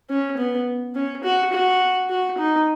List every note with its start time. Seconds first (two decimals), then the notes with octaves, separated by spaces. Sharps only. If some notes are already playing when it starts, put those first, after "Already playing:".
0.10 C#4
0.38 B3
0.95 C#4
1.24 F#4
1.53 F#4
2.10 F#4
2.38 D#4